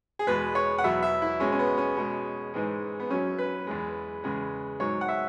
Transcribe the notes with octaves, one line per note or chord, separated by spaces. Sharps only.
G#4
E2 B2 G#3 B4
C#5
F#5
E2 B2 F#3 E5
E5
E4
B2 G#3 C#4
C#4
B3
C#4
B2 G#3
G#2 E3 G#3
B3
F#2 F#3 C#4
B4
E2 E3 G#3
E2 C#3 G#3
G#2 F#3 C#5
F#5
E5